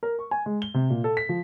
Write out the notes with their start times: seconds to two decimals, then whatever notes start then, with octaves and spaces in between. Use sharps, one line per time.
0.03 A#4
0.19 C#6
0.31 G#5
0.46 G#3
0.62 G7
0.74 C3
0.90 A#2
1.04 A4
1.17 B6
1.29 F3